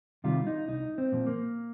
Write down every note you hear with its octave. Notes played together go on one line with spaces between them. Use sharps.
C3 D#3 G3 F4
D#4
C2 D#4
C4
A#2 F3
A#3